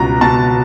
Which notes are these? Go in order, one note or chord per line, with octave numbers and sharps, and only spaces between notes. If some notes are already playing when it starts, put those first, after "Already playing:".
Already playing: C#2 B2 A#5
B2 A5